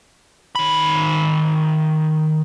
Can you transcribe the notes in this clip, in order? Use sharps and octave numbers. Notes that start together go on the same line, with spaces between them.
D#3 B5